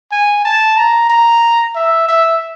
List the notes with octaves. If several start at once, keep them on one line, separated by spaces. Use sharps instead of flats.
G#5
A5
A#5
A#5
E5
E5